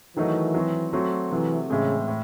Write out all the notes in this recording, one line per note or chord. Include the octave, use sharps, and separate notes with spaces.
D#3 E3 F#3 A3 D#4 F#4
F#3 C4 F#4
F#3 A3 C4 F#4
C3 E3 F#3 A3
A2 C#3 E3 G#3 C4
A2